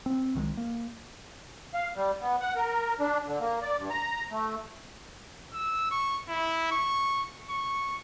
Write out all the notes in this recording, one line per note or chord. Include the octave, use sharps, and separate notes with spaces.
C4
C2 D#3 F#3 G#3
A#3
F5
G3
B3
F#5
A#4
D4
D3
A#3
D5
G2
A#5
A3
E6
C#6
E4
C#6
C#6